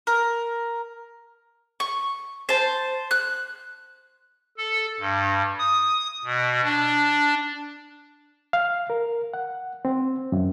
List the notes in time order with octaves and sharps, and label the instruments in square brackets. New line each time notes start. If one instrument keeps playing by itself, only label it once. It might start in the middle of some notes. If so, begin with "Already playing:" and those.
[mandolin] A#4
C#6
C5 A5
F#6
[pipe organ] A4
G2
D#6
B2
D4
[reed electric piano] F5
A#4
F#5
C4
F#2